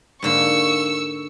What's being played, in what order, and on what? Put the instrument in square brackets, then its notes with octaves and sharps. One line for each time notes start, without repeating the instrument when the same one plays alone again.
[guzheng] G#2 D3 A#3 [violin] C#6 E6